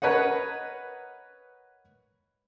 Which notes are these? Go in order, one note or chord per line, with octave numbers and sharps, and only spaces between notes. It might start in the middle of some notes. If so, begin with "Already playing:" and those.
A#4 B4 C#5 D#5 F#5